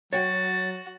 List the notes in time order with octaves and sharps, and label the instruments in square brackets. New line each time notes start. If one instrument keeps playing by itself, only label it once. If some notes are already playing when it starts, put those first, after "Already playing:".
[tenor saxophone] F#3 [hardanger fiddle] F#4 [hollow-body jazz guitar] C#5 G5 [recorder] A6